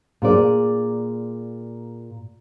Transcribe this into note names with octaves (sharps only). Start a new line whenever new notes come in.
A#2 G#4 D5